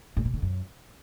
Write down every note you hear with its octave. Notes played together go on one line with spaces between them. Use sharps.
A2
B2
D3
F#2